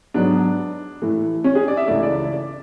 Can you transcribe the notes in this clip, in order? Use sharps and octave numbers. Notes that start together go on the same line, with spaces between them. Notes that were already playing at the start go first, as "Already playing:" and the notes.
G#2 F#3 B3 D4
A2 E3 A3
C#4
G#4
D5
E5
C#2 C#3 E3 A3 D5
D5
D5